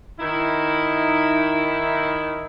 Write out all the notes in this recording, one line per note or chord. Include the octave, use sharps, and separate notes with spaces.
D#3 D#4 E4